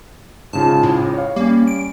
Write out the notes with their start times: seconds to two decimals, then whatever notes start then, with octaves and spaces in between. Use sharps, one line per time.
0.53 G#2 C#3 F4 A5
0.83 A2
1.14 C#5 F5
1.36 G3 A#3 C#4
1.67 D7